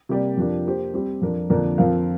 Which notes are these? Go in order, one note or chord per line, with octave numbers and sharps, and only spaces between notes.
C3 G3 A#3 G4 D5
F2 F3 D4 G4 A#4
A#3 G4 C5
G3 C4 G4
F2 F3 D4 A#4
F2 D3 A#3 D4 A#4
F2 F3 C4 A#4 F5